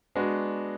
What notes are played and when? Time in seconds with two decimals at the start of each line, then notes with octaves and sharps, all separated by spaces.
0.15 G#3 B3 D4 F#4